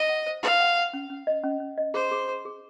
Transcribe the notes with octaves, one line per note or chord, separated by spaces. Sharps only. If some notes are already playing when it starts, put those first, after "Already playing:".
Already playing: D#5
F#5
C5
F5 C6
F#5
F#5
C#4
C#4
D#5
C#4
C#4
D#5
G#4 C5
G#4
G#4
G#4